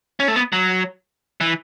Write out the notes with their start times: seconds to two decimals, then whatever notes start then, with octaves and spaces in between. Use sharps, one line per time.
0.20 C#4
0.28 A3
0.36 B3
0.52 F#3
1.41 E3